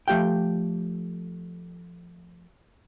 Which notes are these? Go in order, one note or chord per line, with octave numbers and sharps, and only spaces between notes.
F3 A3 G4 F5 G5